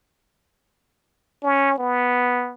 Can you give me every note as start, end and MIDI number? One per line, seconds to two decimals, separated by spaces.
1.43 1.78 61
1.78 2.54 59